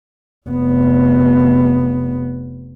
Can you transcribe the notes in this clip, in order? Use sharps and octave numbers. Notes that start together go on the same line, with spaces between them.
F1 B3